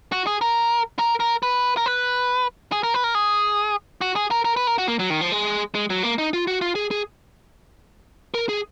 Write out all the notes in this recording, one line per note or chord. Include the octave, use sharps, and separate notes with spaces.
F#4
G#4
A#4
A#4
A#4
B4
A#4
B4
G#4
A#4
B4
A#4
G#4
F#4
G#4
A#4
A#4
B4
A#4
F#4
A#3
F#3
D#3
F3
G#3
G#3
F#3
A#3
D#4
F4
F#4
F4
G#4
G#4
A#4
G#4